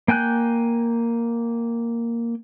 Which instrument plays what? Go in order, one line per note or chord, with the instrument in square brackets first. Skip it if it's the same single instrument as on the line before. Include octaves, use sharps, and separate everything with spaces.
[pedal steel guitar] A#3 G5 G#5 F#6 G6